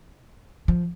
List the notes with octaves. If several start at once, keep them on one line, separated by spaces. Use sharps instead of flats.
F3